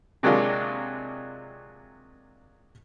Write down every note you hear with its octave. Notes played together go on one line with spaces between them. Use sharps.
C3 F#3 G#3 A#3 D4 F4